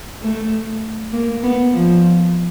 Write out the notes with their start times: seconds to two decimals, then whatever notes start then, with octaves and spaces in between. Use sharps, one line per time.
0.22 A3
1.13 A#3
1.43 B3
1.73 F3